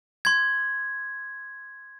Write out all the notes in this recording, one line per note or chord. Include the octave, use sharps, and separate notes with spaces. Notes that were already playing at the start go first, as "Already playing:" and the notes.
C6 G#6